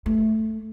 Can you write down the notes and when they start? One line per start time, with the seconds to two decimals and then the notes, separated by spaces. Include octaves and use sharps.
0.06 A3